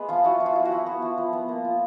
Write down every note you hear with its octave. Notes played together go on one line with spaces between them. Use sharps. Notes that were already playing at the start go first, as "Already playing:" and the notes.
Already playing: G#3 B3 B4
F3 F4
E4 F#4
F3
F4
E4
F#4
E4
B3
F3
F3
B3
A#3
F4